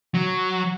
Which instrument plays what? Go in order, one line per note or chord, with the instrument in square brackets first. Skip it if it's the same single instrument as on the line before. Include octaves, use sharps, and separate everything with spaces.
[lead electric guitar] F#3